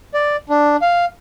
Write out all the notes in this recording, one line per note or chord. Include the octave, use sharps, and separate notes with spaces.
D5
D4
F5